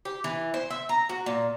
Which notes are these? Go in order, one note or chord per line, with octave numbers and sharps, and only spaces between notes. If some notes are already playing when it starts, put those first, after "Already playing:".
G4
E3
C5
E5
A#5
F#4
A#2